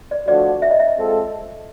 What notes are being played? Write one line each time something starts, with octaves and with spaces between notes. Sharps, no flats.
D5
D3 F3 A3 D4 F#4 D5
E5
D#5
E5
G#3 C4 F4 A4